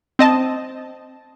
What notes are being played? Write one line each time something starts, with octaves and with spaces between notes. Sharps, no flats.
C4 D#5 A5